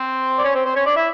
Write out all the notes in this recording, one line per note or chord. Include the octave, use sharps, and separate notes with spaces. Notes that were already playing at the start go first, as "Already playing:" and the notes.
Already playing: C4 C5
D5
C#4 C#5
C4 C5
C4 C5
C#4 C#5
D4 D5
E4 E5